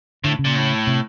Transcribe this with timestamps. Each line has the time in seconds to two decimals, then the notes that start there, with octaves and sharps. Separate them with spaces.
0.24 A2 D3
0.39 C#3
0.45 A#2
0.55 A2
0.87 C3